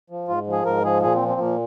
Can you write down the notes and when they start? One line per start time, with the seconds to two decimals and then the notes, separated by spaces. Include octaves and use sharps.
0.10 F3
0.28 G#2 F4
0.47 F3
0.52 G#4
0.65 G#2 A#4
0.84 F3 G#4
1.02 A#2 G#4
1.15 C4
1.21 F3
1.28 C4
1.40 A#2 A#3